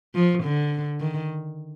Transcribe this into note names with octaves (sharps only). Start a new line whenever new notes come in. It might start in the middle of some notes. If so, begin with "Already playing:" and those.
F3
D3
D#3